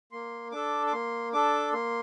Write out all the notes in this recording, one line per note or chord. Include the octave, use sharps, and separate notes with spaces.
A#3 C6
D4 A4 D6
D6
A#3 C6
D4 A4 D6
A#3 C6